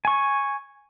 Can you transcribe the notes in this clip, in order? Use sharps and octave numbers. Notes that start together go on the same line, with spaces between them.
G#5 C#6